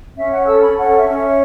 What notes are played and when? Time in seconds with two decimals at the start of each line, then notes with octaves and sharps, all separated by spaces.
0.16 C#4 E5
0.32 F#5
0.46 A4 E6
0.62 B5
0.77 C#4 F#5
0.98 E5
1.08 C#4
1.18 E5